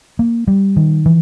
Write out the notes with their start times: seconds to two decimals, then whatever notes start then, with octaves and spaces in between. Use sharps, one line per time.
0.19 A#3
0.47 G3
0.76 D#3
1.06 E3